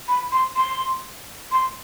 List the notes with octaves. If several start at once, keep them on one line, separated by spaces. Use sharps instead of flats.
B5
C6
C6
C6